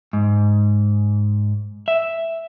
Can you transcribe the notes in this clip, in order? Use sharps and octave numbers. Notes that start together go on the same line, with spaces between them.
G#2
E5